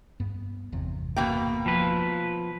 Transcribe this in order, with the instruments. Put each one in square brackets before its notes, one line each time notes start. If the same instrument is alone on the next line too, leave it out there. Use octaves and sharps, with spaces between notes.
[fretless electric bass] G2 B3
G1 E2 C3
[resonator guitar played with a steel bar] B2 A#3 G5
[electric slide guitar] F3 B4